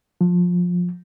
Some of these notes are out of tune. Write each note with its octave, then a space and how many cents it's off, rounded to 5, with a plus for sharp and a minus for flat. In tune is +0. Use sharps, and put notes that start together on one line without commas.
F3 +20